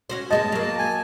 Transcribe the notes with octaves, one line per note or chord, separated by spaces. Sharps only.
C#4 F#4 C5
G2 G#3 B3 D#5 A5
F#3 A#3
G#5